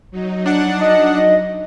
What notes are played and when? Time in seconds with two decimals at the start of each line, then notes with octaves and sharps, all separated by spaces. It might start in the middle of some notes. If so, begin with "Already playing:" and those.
0.11 F#3 D#4
0.46 D4 F#5
0.81 D#5